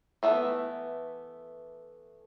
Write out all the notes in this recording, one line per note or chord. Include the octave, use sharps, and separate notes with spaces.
E3 A3 B3